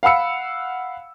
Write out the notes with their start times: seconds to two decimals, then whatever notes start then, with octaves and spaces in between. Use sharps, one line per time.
0.03 F5 F#5 B5 E6 C#7